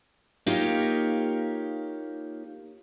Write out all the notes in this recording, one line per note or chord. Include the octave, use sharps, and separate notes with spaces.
A#3 D#4 F4 G4 C#5